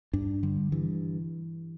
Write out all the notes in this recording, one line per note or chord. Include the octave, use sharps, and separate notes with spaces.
G2 D4
D3 G3
G2 E3